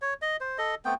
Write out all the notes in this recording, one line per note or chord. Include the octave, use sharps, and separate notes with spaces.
C#5
D#5
C5
A4 D#5
A3 B3 C4 G5